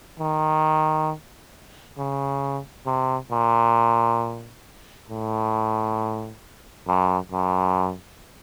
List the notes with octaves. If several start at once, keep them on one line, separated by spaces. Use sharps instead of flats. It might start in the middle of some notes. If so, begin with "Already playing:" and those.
D#3
C#3
C3
A#2
A2
F#2
F#2